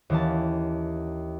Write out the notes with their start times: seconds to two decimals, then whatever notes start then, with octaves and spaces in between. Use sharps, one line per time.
0.10 D#2 E3 C#4 A5